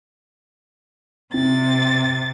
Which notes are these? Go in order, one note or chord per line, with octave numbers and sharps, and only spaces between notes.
C3 C4 A6